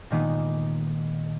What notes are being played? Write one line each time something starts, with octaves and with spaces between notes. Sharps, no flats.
A#2 D#3 G#3 A#3 B3 D#4